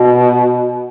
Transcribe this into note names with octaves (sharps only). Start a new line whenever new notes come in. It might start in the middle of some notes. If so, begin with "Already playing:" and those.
Already playing: B2